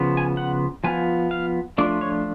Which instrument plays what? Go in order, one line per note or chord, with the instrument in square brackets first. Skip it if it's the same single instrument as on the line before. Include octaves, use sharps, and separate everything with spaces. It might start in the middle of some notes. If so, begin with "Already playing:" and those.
Already playing: [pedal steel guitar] C#3 F3 B3
G#5
F#5
F3 B3 F4 G#5
F5
F3 A3 D4 F4 D5
C#5